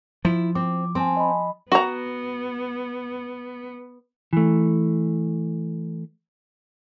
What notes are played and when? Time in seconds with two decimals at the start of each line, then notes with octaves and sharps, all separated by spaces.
0.25 F3 E4
0.55 C4 D6
0.95 C4 G#5 A5 C6
1.17 D#5 B5
1.72 B3 F#4 A#5
4.33 E3 A3